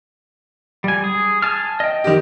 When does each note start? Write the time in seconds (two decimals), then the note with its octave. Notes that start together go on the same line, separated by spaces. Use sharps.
0.84 G3 G#5
1.04 G#4
1.42 G#5 A5 F6
1.80 D#5 G5
2.04 D#3 G4